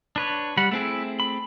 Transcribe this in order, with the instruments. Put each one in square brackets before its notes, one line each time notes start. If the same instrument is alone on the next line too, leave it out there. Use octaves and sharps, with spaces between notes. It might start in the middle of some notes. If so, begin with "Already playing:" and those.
[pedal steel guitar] D4 B4 C#5
[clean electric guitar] G3 [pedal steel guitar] F#5 B5
[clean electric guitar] A3 C4 G#4 [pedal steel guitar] E4
[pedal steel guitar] B5